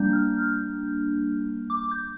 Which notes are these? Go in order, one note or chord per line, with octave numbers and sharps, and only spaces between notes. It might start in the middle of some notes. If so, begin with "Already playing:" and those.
Already playing: G3 A#3 D4 G6
F6
D6
G6